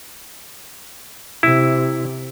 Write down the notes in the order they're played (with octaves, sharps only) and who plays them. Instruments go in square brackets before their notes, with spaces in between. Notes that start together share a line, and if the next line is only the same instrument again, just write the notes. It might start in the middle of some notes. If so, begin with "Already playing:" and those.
[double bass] C3 [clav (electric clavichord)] E4